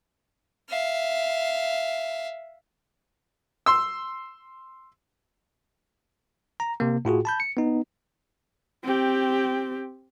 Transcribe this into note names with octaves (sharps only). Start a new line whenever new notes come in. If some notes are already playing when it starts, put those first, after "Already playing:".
E5 F5
C6 E6
A#5
C3 A#3
A2 F4 F#4 G#4
A5 B5 G6
C#7
B3 D#4
C4 G4